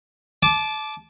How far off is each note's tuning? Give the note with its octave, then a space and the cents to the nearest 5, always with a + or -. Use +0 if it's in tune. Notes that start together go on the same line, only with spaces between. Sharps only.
A5 -25 D6 +0